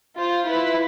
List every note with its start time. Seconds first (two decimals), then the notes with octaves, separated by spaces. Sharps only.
0.18 F4 C5
0.49 E4 B4